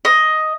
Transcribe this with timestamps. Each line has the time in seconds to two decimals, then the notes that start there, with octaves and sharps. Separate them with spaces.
0.05 D#5